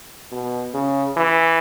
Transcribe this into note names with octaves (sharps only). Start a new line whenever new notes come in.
B2
C#3
E3